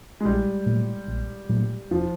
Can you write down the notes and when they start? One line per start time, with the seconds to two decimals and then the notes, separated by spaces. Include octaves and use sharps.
0.20 G#3
0.25 A#1 G3
0.66 A#2 F#3 A3
1.08 A#1
1.49 A#2 F#3 A3
1.91 E1 F3